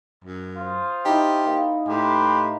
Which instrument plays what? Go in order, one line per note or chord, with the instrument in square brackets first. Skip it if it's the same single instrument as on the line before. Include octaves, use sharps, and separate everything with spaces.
[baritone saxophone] F#2
[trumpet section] F4 C5 D#6
[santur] D#4 E4 [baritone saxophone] G4
[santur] A#3
[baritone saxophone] A2 [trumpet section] G4 B4 C6